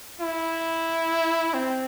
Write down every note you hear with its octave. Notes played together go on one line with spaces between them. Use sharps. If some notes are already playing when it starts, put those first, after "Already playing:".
E4
C4